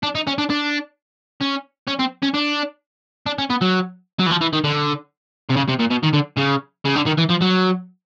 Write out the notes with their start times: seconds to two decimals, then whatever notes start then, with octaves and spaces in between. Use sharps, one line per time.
0.03 D4
0.15 D#4
0.27 C#4
0.38 D4
0.50 D4
1.41 C#4
1.88 C#4
2.00 C4
2.23 C#4
2.34 D4
3.26 D4
3.38 C#4
3.50 B3
3.61 F#3
4.19 F#3
4.26 E3
4.31 F3
4.41 E3
4.53 D#3
4.64 D3
5.50 C3
5.57 C#3
5.69 C3
5.80 A#2
5.91 B2
6.03 D#3
6.14 D3
6.38 C#3
6.85 C#3
6.96 D3
7.06 D#3
7.18 E3
7.29 F3
7.41 F#3